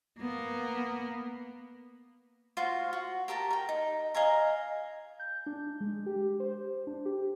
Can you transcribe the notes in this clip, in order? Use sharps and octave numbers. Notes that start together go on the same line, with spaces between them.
A#3 B3
F4 F#4 C5 F5
F#4
G4 A#4 A5 A#5
A#4 G5
D#4
D#5 F5 G#5 A#5
G6
D4
G#3
G4
C5
D4
G4